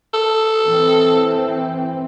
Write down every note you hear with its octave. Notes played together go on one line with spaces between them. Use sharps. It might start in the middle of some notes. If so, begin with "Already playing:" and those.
A4
E3 C4